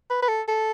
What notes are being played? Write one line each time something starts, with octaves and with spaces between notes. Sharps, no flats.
B4
B4
A4
A4